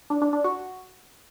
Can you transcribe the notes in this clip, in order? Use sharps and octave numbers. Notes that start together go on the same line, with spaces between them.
D4
D4
D4
F#4